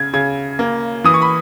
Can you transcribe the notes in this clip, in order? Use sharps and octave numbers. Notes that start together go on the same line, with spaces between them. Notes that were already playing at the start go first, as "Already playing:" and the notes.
Already playing: C#3 G#6
C#3 G#6
A#3
E3 D#6
C#6
B5